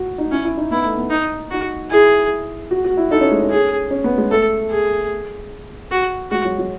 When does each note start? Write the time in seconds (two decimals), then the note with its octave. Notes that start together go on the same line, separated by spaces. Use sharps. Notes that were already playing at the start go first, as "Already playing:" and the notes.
Already playing: F#4
0.18 D#4
0.31 C#4 E4
0.44 E4
0.57 D#4
0.71 B3 E4
0.85 A3
0.97 B3
1.11 D#4
1.51 D#4 F#4
1.91 E4 G#4
2.71 F#4
2.84 F#4
2.97 E4
3.11 D#4 A4
3.21 C#4
3.32 G#3
3.42 C#4
3.51 G#4
3.91 C#4
4.04 B3
4.18 G#3
4.31 A3 A4
4.71 G#4
5.92 F#4
6.31 G#3 F#4
6.45 F#3
6.58 F#3